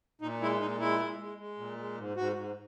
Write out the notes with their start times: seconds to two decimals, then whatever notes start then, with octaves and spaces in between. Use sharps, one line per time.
0.21 A#2 D#4
0.41 G#3 E4
0.60 A#2 D#4
0.80 G#3 E4
1.00 G#3
1.19 G#3
1.38 G#3
1.58 A#2
1.77 G#3
1.97 G#2
2.16 G#2 F#4
2.36 G#2